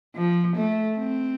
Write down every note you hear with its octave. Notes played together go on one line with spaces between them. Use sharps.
F3
A3
C4